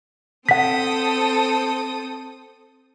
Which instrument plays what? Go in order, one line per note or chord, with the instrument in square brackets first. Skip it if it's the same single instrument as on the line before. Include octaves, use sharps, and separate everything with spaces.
[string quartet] C4 A4 D#6 [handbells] F#5 B6